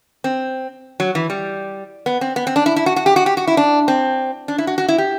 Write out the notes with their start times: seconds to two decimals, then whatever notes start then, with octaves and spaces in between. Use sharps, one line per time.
0.24 C4
1.00 F#3
1.15 E3
1.30 G3
2.06 B3
2.21 C4
2.36 B3
2.47 C4
2.56 D4
2.66 E4
2.76 E4
2.86 F#4
2.96 F#4
3.06 G4
3.16 F#4
3.26 G4
3.37 F#4
3.48 E4
3.57 D4
3.88 C4
4.48 D4
4.58 E4
4.67 F#4
4.78 F#4
4.89 E4
4.98 G4